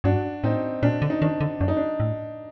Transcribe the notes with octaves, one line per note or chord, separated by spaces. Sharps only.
G2 D4 F#4
A2 C4 D#4
A#2 D4
D3
D#4
D#3 D4
D3
F#2 D4
D#4
D4
A2